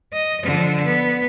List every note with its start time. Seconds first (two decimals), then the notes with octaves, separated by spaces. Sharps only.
0.13 D#5
0.44 D3 F3
0.85 B3